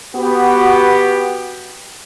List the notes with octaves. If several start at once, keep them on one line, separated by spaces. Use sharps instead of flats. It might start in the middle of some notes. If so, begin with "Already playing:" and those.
B3 F#4 G4